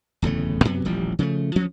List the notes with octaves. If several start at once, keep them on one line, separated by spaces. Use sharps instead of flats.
D1 E2 C#3 A3
F#2 C3 F#3 B3
D#1 A1 F3 G3
C#3 F3 F#3 A3
D2 F3 C#4